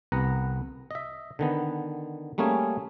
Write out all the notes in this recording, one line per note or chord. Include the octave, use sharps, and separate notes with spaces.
C2 B3 F#5 A#5
D#5 E5
D3 D#3 B3
G3 A3 A#3 C#4 G#4